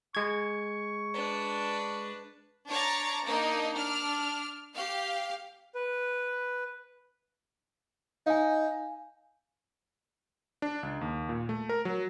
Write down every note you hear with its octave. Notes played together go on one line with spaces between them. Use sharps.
G#3 C#6 G#6
D4 B4
D4 C#5 A#5 A6
A#3 D4 D#4 D#5
D4 F6
G4 F5
B4
D#4 F5 G#5
D4
C#2
D#2
A#2
A3
A#4
F#3